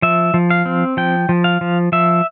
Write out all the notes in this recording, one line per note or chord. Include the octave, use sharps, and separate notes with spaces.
F3 E5
F3
F5
C4
F3 G5
F3
F5
F3
F3 E5